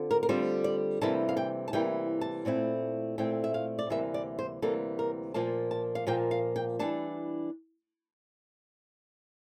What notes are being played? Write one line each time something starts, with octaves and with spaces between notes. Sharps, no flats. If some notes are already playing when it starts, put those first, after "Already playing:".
Already playing: D3 C4 F4
A#4
A#4
D3 G3 C4 F4 C5
D5
C3 E3 G3 A#3 E4 A5
F5
G5
A5
C3 E3 G3 A#3 E4 G5
A5
A#2 A3 C4 E4
A#2 A3 C4 E4 G5
E5
F5
D5
D2 C3 E3 G3 A#3 E5
D5
C5
D2 C3 E3 G3 A#3 A4
A#4
A#2 F3 A#3 F4 A5
A5
F5
A#2 F3 A#3 F4 G5
F5
G5
E3 G3 D4 A5